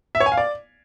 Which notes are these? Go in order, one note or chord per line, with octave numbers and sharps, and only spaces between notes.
E5
C#5
G#5
F5
D5